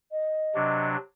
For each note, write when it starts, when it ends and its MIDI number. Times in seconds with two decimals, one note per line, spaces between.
0.12 0.88 75
0.55 0.97 48
0.55 0.97 54
0.55 0.97 62